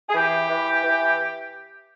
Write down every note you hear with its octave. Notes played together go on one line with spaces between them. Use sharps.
G#4
E3 G4
E3
E3